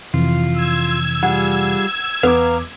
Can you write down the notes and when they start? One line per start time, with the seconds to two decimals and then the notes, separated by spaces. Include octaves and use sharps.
0.14 F2 C3 E3 F4
0.54 E6 G#6
1.23 G3 F4 G#4 F#5
2.23 E2 B3 F5 A#5 D6